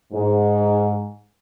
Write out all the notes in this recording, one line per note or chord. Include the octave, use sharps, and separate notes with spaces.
G#2